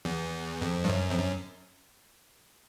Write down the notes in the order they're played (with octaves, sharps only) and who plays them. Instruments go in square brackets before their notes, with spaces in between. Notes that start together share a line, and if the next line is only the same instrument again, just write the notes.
[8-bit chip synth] E2
F2
G2
F#2
F2
F#2